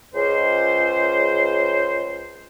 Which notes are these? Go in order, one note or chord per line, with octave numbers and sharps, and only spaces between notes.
C#2 C5